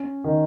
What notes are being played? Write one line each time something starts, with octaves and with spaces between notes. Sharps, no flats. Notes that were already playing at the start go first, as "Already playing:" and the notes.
Already playing: C#4
D#3